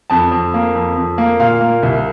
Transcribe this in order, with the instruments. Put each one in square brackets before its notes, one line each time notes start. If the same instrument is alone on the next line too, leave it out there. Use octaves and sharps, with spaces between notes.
[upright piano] F2 A5
F2
A#3
F2
F2
A#3
A#2 F5
A#3
C2